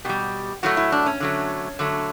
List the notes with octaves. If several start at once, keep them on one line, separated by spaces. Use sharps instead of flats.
B2 G3 G4
A2 F#3 A3 F#4
E4
D4
C#4
D3 F#3 A3
D3 F#3 A3